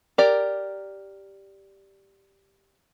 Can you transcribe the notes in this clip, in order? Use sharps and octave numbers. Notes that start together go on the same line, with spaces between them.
G4 A#4 D5